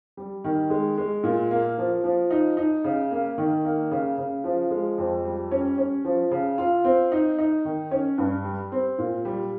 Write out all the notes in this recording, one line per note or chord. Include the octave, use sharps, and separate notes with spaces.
G3
D#3
G#3
G#3
A#2
A#3
F3
F3
D#4
D#4
C#3
A#3
D#3
A#3
C#3
C#3
F3
G#3
F2
G3
C#4
C#4
F3
C#3
F4
C4
D#4
D#4
D#3
C#4
G2
G3
C4
A#2
G3